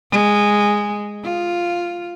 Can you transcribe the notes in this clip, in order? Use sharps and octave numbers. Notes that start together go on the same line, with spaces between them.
G#3
F4